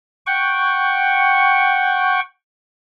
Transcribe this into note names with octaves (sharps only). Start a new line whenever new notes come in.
F#5 G5 C#6